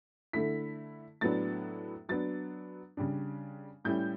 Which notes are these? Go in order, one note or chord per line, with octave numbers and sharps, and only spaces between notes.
D3 A3 E4 B6
A2 F#3 B3 D4 A6
F#3 B3 D4 A6
C#3 G3 D4
A2 G3 C#4 E4 G6